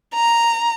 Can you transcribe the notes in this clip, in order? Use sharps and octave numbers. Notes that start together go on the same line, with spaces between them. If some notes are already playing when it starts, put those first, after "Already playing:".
A#5